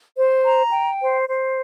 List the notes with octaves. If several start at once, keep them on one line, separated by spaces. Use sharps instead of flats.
C5
A#5
G5
C5
C5